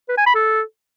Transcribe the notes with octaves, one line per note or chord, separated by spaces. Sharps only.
B4
G#5
B5
A4